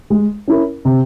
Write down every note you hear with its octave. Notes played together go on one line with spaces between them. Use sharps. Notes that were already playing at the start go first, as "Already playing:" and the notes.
G#3
C#4 E4 A#4
C3